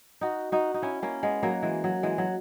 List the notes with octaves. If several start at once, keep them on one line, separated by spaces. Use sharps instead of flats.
D#4 F#4
D#4 F#4
D#4
C#4 E4
A#3 C#4
G#3 B3
F#3 A#3
E3 G#3
F#3
E3 G#3
F#3